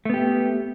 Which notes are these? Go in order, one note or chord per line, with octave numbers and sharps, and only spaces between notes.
A3 B3 G4